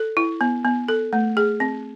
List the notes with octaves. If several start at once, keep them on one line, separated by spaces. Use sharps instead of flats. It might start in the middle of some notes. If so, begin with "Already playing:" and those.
Already playing: A4
E4
B3
B3
A4
A3
G#4
C4